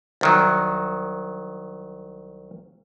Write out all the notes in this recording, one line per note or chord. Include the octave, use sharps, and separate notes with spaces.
C2 D#3 F#3